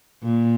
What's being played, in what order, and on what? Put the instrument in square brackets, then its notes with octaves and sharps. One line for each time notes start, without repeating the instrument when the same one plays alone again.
[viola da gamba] A#2